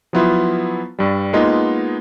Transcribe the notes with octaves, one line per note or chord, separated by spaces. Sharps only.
F3 F#3 B3 E4 F4
G2 G3
G#3 A#3 B3 D#4 F4